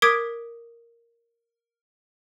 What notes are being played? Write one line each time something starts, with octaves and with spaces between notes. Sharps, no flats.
A#4 D6 D#6 G#6 B6 D7